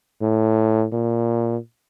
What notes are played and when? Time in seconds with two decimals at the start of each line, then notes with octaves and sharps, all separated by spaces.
0.22 A2
0.93 A#2